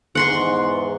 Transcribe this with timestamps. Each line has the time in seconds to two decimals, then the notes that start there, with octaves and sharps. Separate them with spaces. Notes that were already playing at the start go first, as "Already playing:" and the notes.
0.15 E2 G#2 F#5 C6 C#6